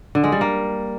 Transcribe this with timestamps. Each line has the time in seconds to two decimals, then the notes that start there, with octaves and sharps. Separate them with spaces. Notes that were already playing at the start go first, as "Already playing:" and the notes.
0.15 D3
0.24 G#3
0.32 G3
0.41 A#3